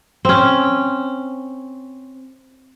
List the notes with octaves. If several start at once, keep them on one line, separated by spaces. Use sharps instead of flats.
C4 C#4